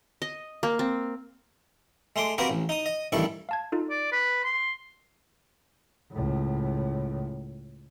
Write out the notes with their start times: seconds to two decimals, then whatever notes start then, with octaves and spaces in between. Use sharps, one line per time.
0.22 D#5
0.63 A#3
0.79 C4
2.16 G#3 A3 C6 D6
2.38 A#3 C4 F#4 G4 A#4 B4
2.50 A1
2.69 D#4 D#6
2.86 D#5
3.12 A1 G2 D#3 E4 A4 C#6
3.49 F5 A5 G#6
3.72 D#4 F4 A4
3.90 D5
4.12 B4
4.44 C6
6.12 C#2 A2